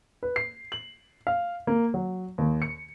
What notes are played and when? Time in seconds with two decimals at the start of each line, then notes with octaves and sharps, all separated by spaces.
0.23 B4
0.36 C7
0.72 F#7
1.27 F5
1.67 A#3
1.94 F#3
2.38 D#2
2.62 C#7